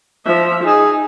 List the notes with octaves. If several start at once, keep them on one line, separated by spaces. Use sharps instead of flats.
F3 E5
D#4 G#4